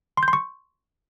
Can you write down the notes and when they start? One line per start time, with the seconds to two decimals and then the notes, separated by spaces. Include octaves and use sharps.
0.17 C6
0.23 G6
0.28 C6
0.33 C#6